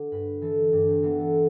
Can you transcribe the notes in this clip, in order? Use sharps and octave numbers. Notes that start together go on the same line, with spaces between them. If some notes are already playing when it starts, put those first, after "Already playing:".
Already playing: D3
G2 B4
E3 A4
G2 D4
C4
E3 B3
A4